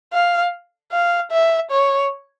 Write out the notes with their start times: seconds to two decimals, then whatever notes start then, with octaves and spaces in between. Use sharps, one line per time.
0.13 F5
0.92 F5
1.32 E5
1.71 C#5